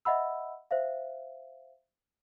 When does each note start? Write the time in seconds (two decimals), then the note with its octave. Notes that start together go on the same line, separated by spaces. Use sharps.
0.05 D#5 E5 F#5 B5 E6
0.71 C5 E5 F5